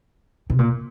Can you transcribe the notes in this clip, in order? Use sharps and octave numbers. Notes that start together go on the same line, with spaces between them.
C3
A#2